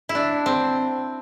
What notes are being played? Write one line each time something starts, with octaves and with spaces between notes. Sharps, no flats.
E4
D4
C4